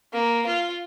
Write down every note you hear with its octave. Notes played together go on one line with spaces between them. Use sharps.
A#3
F4